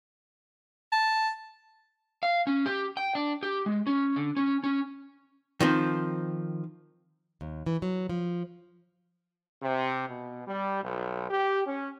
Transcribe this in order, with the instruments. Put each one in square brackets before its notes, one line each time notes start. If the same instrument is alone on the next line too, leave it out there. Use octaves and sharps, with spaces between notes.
[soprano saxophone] A5
[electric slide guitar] F5
C#4
G4
G5
D4
G4
G#3
C#4
D3
C#4
C#4
[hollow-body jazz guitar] D#3 F3 C4
[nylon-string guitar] D#2
E3
F#3
F3
[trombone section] C3
B2
G3
B1
G4
C#4